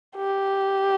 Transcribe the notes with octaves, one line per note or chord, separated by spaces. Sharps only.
G4